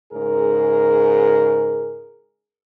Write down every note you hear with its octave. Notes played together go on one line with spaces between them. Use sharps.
G#2 C#3 G#4 A#4